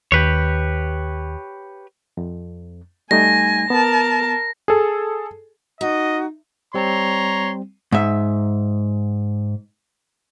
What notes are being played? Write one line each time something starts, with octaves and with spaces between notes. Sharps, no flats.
D#2 G4 B4 C#5
F2
G3 A3 D#4 G#5 A#6
B3 A#4 A5
G#4 A4
D#4 F#4 D#5
G3 C4 C#5 A#5 C6
G#2 E5